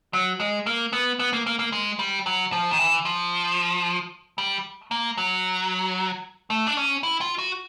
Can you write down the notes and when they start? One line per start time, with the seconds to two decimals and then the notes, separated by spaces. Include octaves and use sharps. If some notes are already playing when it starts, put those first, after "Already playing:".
0.13 F#3
0.40 G#3
0.66 A#3
0.93 B3
1.19 B3
1.33 A#3
1.46 A#3
1.59 A#3
1.72 G#3
1.99 G3
2.26 F#3
2.52 F3
2.71 D#3
2.79 E3
3.05 F3
4.38 G3
4.91 A#3
5.17 F#3
6.50 A3
6.67 D4
6.77 C#4
7.03 E4
7.21 F4
7.38 F#4